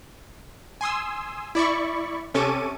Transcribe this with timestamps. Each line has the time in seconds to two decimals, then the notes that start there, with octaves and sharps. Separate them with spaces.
0.81 G#5 C6 D#6 E6
1.55 E4 D5 B5 C#6
2.34 C3 C#4 A4 C#6 D6 D#7